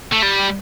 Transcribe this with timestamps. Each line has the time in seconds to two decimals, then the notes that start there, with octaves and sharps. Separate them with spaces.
0.12 A3
0.22 G3